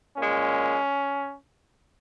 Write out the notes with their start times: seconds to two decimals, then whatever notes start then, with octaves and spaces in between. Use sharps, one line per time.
0.17 A#2 G#3 C#4